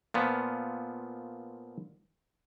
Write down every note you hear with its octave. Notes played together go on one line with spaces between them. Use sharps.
A#2 F3 B3